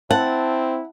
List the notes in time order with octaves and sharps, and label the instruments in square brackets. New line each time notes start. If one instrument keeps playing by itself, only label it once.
[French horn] C4 [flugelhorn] E4 [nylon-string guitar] F#5 [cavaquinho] A5